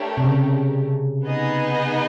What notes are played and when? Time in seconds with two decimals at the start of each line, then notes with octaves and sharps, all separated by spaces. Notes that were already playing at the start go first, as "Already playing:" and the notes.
Already playing: A3 D4 G4 A#4 C#5
0.17 C3
0.24 C#3
1.27 B3 D#4 G#4 B4 D#5